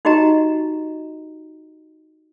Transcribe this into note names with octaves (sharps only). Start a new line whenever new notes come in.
D#4 F#4 G4 D#5 A#5